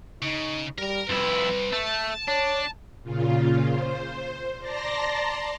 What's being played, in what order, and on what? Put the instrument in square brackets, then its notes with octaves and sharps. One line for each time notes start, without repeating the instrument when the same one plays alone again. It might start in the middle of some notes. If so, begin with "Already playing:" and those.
[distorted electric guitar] C#3 [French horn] D#4
[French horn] G3 [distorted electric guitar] A#4 A#5
[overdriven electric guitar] F2 E4 [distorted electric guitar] G3 C4 [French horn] B4
[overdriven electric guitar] A3 [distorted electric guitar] A5
[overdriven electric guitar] D4 [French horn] C#5
[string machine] A#2 C#3 F4
C5
D5 A5 A#5 C6 A#6